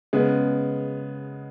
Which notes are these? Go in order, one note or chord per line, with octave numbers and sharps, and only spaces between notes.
C#3 G#3 B3